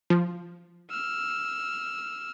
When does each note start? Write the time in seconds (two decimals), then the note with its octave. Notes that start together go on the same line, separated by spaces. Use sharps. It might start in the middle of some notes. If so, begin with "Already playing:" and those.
0.10 F3
0.90 E6 F6